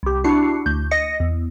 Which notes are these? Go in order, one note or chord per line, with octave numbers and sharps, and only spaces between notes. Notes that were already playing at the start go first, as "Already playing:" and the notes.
C2 G4
D4 E4 F#4 C7 C#7
D2 G6
D#5 A#6 C#7
E2